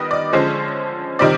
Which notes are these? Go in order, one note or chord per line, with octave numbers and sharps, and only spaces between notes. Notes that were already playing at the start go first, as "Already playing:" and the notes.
Already playing: D#3 G3 B3 B4 D#5
D5
D3 F3 G#3 C#4 C5
C3 D#3 G3 C4 D5